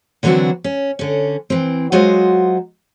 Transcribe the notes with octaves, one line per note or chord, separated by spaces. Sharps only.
D3 E3 F#3 C4 D4 F#4
C#4
D3 C#4
E3 C4
F#3 G#3 F4 F#4 C5 D#5